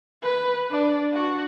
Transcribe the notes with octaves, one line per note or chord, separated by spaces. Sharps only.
B4
D4 D5
D4 F#4